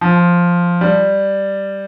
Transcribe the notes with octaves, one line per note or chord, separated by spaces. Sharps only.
F3
G3